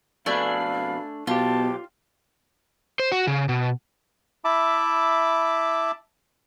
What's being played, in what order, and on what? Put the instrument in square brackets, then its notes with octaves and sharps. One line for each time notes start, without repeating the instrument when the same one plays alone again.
[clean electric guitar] F2 B2 B4 [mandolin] A3 D4 G#5 [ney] F5
[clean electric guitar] B1 G4 [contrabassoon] B2 [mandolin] F4 [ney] A5
[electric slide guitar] C5
F#4
C#3
B2
[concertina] E4 E5 A5 B5 D6